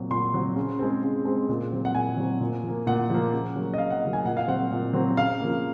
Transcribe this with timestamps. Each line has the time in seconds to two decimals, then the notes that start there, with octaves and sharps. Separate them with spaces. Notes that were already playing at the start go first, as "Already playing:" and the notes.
Already playing: A#2 F#3 C4
0.10 A#2 C6
0.34 F#3 C4
0.56 C#3
0.79 G#3 C4
1.03 C#3
1.25 G#3 C4
1.49 A#2
1.72 F#3 C4
1.85 F#5
1.95 A#2 G#5
2.17 F#3 C4
2.40 A#2
2.63 F3 A#3
2.87 A#2 F#5
3.10 F3 A#3
3.33 C#3
3.56 F#3 A#3
3.74 D#5
3.78 C#3 F5
3.90 F#5
4.02 F#3 A#3
4.13 G#5
4.25 A#2 F#5
4.37 F5
4.48 F#3 C4 F#5
4.71 A#2
4.93 F#3 C4
5.17 C#3 F5
5.40 F3 A#3